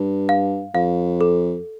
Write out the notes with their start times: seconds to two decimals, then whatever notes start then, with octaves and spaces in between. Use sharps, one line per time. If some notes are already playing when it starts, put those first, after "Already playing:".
Already playing: G2
0.29 F5
0.74 F2 F5
1.21 A4